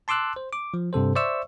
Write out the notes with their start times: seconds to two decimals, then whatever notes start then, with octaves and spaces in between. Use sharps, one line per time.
0.08 A5 C6 D6 E6 F#6
0.36 C5
0.53 D6
0.74 F3
0.93 G2 C3 A4 C5
1.15 C5 D5 E5 C#6 E6